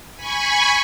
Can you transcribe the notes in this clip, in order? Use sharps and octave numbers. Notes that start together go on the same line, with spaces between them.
G#5 B5 C#6